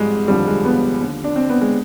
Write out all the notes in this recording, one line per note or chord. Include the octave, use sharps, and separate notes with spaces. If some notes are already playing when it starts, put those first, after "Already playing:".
Already playing: G#1 G#2 F3 G3 G#3
F1 D#2 D3 F3 G3
G#3
B3
D#2 D3 F3
D4
C4
B3
G#3